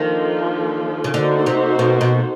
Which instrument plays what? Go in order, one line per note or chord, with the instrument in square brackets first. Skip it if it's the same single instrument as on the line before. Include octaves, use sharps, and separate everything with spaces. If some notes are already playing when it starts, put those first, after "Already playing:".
Already playing: [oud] D#3 [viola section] F3 A#3 D4 F4 A4
[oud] C#3
[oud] D3 [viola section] A#3 D#4 F#4 A4 C5
[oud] C3
B2
B2